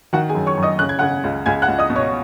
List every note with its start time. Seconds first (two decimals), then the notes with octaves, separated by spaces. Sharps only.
0.13 D#3 F#4 F#5
0.29 G#4 G#5
0.35 F#2
0.46 C#5 C#6
0.57 F#2
0.63 D#5 D#6
0.79 C#3 F#6
0.89 G#6
0.99 C#3 F#5 F#6
1.24 C#2
1.46 C#2 G#5 G#6
1.62 F#5 F#6
1.68 C#2
1.78 D#5 D#6
1.90 B2
1.96 C#5 C#6